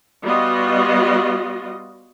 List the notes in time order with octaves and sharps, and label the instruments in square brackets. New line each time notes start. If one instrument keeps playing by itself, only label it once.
[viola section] G3 B3 F4 F#4 D#5